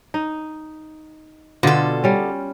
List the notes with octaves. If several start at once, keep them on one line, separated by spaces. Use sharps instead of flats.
D#4
B2 D3 F4 F#4 A4
G3 C#4